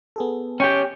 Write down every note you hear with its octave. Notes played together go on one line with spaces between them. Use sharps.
B3 G#4 A4
C#4 G4 G5